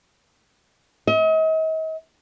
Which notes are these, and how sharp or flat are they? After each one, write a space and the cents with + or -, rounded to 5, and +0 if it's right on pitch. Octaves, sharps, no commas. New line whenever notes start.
D#5 +40